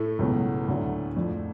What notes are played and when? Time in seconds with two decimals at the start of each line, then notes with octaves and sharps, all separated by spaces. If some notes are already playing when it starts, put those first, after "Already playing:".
Already playing: A2 A3
0.19 C#2 B2 F#3 B3
0.68 D2 D3 F#3
1.16 F2 F3 A3 D4